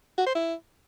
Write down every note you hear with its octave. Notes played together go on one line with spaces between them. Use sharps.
F#4
C5
E4